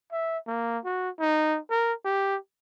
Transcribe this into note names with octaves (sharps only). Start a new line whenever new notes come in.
E5
A#3
F#4
D#4
A#4
G4